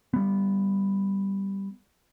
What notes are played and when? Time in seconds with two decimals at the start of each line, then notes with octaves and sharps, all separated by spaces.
0.14 G3 B3